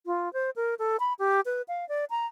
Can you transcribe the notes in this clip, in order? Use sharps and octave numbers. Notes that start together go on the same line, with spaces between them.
F4
C5
A#4
A4
B5
G4
B4
F5
D5
A#5